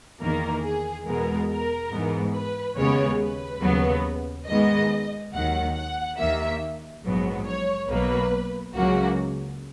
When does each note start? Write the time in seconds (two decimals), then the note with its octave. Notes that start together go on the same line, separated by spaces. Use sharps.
0.20 E2 D#3 A#3 A#4
0.63 G#4
1.06 E2 B2 G#3 B3 A#4
1.49 A#4
1.92 G#2 E3 B3
2.34 B4
2.77 D#2 C#3 G#3 B3 C#5
3.20 B4
3.63 D#2 C#3 F#3 B3
4.47 G#2 D#3 G#3 B3 D#5
5.33 D#2 D#3 F#3 F#5
5.76 F#5
6.18 D#2 D#3 A#3 E5
7.03 A#1 G#2 F#3 B3
7.46 C#5
7.89 B1 B2 F#3 A#3 B4
8.75 C#2 C#3 F#3 A#3 F#4